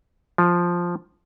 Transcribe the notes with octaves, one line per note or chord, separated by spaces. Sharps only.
F3